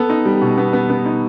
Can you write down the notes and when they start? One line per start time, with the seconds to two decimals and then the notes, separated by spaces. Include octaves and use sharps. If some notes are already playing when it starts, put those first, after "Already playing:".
Already playing: B3 A4
0.10 D#4
0.26 G3
0.42 B2
0.58 B3
0.73 B3
0.90 B3
1.06 D#4